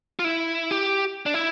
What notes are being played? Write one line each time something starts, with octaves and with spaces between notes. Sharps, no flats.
F4
E4
G4
D4
E4